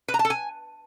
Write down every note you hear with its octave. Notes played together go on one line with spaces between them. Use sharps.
B4
A#5
A5
A4
G#5